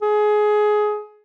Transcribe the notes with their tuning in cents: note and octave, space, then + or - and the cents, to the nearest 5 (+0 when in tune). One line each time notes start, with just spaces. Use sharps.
G#4 +20